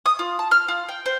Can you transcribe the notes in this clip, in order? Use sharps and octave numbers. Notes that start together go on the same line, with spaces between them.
D#6
F4
A5
F6
F4
G5
C5